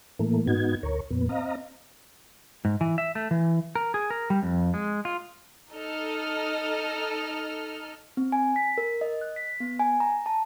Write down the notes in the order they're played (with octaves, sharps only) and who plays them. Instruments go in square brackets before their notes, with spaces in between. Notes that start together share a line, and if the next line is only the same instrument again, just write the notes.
[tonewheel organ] A2 E3 A3 A#3
G#2 B3 D#4 F#4 G#6
D2 A#4 C#5
F2 A#2 B3
C4 D#5 F5 A#5
[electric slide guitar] G#2
E3
E5
A3
E3
A#4
G#4
A#4
G3
F2
G#3
F4
[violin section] D#4 A4 D#5 F6
[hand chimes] C4
G#5
B6
A#4
D#5
F#6
B6
B3
G#5
A#5
A5